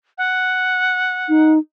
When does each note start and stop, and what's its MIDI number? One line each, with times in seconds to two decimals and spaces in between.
0.18 1.52 78
1.29 1.58 63